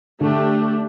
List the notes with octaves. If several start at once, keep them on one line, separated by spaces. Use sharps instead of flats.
D3 A3 D4 G4